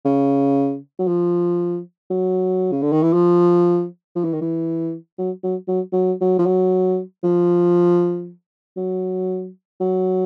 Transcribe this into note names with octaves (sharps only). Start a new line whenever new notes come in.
C#3
F#3
F3
F#3
C#3
D3
D#3
E3
F3
F3
E3
D#3
E3
F#3
F#3
F#3
F#3
F#3
F3
F#3
F3
F#3
F#3